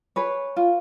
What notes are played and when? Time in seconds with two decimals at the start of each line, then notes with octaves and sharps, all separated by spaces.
0.16 G#4 B4 C#5
0.56 F4